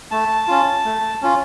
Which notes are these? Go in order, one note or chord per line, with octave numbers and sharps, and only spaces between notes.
A3 A5
C#4 F4
A3
C#4 F4